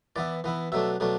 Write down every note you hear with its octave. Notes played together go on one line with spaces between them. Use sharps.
E3 B3 E4 D5
E3 B3 E4
B2 F#3 A3 D4 E5
B2 F#3 A3 D4